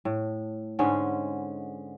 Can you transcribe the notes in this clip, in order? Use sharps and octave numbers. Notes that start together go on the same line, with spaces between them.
A2
G#2 D3 G#3 C#4